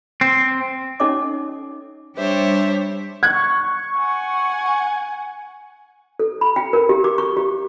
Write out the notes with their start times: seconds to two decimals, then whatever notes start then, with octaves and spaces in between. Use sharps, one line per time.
0.21 C4
1.00 C#4 D#4 A4 C#5 D#5 D6
2.17 G3 D4 G4 C5 C#5 E5
3.23 C#6 F#6 G#6
3.97 F#5 G#5
6.19 A4
6.41 B5
6.56 G5
6.73 A#4
6.89 G4
7.04 D6
7.18 C#6
7.37 G4